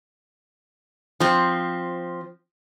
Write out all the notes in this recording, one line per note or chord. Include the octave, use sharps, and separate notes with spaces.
F3 C4